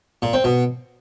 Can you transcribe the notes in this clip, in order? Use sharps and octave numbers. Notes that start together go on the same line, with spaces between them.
A#2
C4
B2